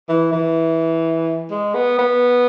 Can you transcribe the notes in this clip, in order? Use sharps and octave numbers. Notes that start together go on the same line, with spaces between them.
E3
E3
G#3
B3
B3